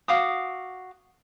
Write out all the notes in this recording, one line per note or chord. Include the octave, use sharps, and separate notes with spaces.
F#4 F5 D6 D#6